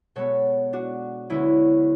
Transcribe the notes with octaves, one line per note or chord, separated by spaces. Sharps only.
B2 G#3 B3 A4 C#5
D4 F#4
D2 D3 G#3 B3 C#4 E4